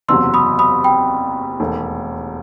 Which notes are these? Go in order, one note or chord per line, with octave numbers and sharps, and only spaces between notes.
F#1 E2 C3 F#3 C6 E6
B5 D#6
B5 D#6
G5 B5
E1 D#2 D#3 A3